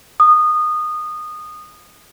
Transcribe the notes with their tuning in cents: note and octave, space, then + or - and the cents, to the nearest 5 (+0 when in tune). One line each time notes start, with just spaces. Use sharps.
D#6 -20